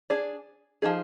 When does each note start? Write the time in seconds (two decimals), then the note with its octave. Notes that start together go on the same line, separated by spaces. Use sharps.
0.10 D4 G#4 D5
0.82 F3 G#3 D#4 G#4